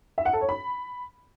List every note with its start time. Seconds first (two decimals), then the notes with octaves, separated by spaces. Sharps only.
0.18 E5
0.25 F#5
0.33 A4
0.41 C#5
0.49 B5